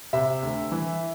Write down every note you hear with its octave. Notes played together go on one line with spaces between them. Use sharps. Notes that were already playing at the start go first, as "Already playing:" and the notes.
C3 E5
D2
E3